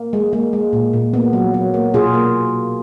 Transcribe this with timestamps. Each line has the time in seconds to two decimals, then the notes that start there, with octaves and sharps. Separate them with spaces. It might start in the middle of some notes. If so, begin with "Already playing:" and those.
Already playing: A#3
0.13 G#3
0.33 G#3 A#3
0.53 G#3
0.73 A#2
0.93 A#2
1.13 A#3 B3
1.33 F#3
1.54 F#3
1.74 A#3
1.94 B2 F4 G#4
2.14 A#3